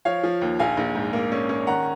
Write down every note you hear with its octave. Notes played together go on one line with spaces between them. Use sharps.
F3 C#5 F5
F3
D#2
A#1 F5 G#5
A#1
G#2
A#3
C#4
C#4
D#3 F#5 A#5